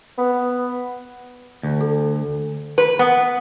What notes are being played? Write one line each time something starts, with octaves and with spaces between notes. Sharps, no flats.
B3
D2
A4
B4
B3